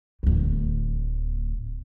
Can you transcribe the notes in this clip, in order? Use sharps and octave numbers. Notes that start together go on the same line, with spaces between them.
D1 D2